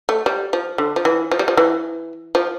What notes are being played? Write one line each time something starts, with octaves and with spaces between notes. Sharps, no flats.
A3
G3
F3
D3
F3
E3
F3
G3
F3
E3
F3